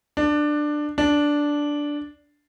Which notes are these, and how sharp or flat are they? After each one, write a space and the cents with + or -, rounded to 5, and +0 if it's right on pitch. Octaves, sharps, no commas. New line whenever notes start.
D4 +15
D4 -5